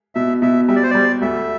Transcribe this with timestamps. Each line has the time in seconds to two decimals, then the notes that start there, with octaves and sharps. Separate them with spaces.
0.15 B2 E5
0.42 B2 E5
0.68 G3 E5
0.76 D5
0.83 C5
0.91 G3 D5
1.22 D2 E5